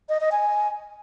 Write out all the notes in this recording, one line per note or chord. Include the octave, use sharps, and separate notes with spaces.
D#5
D#5
G#5